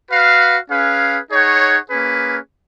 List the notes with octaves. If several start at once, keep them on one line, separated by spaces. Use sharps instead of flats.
F#4 B4 F5
C#4 G#4 B4 F5
D#4 G#4 C#5 F#5
A#3 C#4 G#4 B4